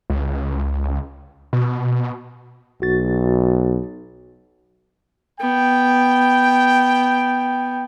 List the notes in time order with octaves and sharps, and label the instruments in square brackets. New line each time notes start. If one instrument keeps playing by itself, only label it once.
[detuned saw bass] C#2
B2
[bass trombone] B1 [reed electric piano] F#4 A6
[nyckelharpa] B3 [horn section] G5